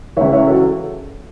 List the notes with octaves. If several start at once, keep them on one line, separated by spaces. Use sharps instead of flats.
C#2 C#3 E3 C#5 E5
C#5 E5
F#4 A4